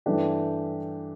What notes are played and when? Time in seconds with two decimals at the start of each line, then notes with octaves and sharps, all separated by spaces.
0.06 G2 E3 A3 D4 G4